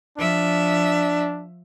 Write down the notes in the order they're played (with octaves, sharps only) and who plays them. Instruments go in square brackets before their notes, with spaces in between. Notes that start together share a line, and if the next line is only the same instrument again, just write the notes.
[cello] F3 E5 [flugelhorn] D4